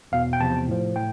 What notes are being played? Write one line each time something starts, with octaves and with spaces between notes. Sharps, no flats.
E2 B2 F5
G5
E2 C3 F3 A5
A2 F3
A2 G5